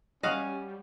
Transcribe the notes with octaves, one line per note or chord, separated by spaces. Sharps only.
G3 C#4 F#4 D#5 F5